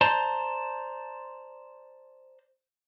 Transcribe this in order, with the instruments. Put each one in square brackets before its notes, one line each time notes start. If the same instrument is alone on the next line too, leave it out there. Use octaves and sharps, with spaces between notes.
[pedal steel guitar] C5 D5 A5 A#5 C6